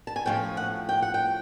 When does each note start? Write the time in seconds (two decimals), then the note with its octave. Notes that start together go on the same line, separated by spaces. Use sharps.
0.07 A5
0.16 G#5
0.25 A2 F3 A#3 C#4 G5
0.57 F#5
0.89 G5
1.02 F#5
1.14 G5